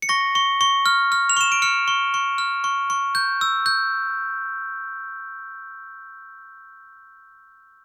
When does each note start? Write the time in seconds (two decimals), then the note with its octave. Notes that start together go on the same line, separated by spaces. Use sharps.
0.02 C#7
0.09 C#6 A#6
0.35 C#6
0.61 C#6
0.86 F6
1.12 F6
1.29 F7
1.37 C#6 E7
1.52 D7
1.62 F6 C#7
1.88 C#6
2.14 C#6
2.38 F6
2.64 C#6
2.90 C#6
3.15 G6
3.41 E6
3.66 G6